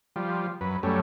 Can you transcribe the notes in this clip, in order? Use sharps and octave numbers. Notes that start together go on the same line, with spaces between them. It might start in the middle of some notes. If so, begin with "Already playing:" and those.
F3 G3
F#2 B4
F#2 G3 A3 C#4